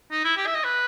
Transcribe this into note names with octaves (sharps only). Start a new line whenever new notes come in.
D#4
E4
G4
E5
D#5
B4